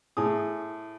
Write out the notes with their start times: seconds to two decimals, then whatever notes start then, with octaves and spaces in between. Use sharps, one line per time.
0.17 A2 G#4 D#6